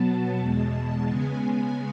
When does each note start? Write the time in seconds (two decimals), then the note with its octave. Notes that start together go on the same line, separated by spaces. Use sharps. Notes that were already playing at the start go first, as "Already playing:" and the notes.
Already playing: B2 F#3 B3 A5
0.39 E2 B2 G#3
1.09 C#3 G#3 B3 G#5